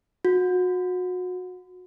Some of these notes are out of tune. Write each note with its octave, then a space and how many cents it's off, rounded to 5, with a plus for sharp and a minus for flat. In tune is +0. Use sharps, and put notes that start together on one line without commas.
F#4 -30